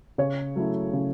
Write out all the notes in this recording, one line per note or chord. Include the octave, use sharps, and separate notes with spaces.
C#3 C#5
F#3 A3 C#4 E4
C#3